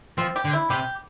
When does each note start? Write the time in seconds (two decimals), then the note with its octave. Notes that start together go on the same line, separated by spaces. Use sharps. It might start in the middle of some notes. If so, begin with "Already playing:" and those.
0.18 F3 C4
0.36 G4
0.45 D3
0.53 E4
0.70 C3 G4